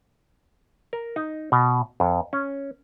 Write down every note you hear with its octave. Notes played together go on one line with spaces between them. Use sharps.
A#4
D#4
B2
F2
C#4